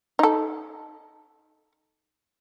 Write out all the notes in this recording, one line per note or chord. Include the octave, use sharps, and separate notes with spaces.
D#4 A4